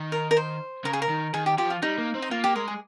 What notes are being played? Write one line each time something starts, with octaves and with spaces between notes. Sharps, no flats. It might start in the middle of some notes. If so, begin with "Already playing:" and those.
Already playing: D#3
A#4
A#4
C5
C#3 A#4
G#4
A#4
D#3
D#3 G#4
G4
F3 G4
F4
G3 D#4
A#3
C4
D#4
A#3 F4
A#3 G4
G#3 A#4
G#4